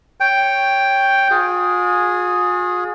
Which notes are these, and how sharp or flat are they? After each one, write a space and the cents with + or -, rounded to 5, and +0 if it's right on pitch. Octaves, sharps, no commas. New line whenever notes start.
C#5 +0 G5 +0
F4 +45 G#4 +0